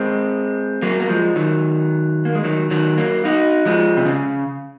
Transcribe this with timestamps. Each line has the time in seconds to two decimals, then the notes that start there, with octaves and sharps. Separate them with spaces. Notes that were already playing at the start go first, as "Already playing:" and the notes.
Already playing: G#3 C4
0.82 F#3 A#3
1.00 A#3
1.09 F3 G#3
1.36 D#3 F#3
2.25 A#3
2.35 G#3
2.44 D#3 F#3
2.71 D#3 F#3
2.98 F#3 A#3
3.25 D#4 F#4
3.65 F3 G#3
3.97 C3
4.06 C#3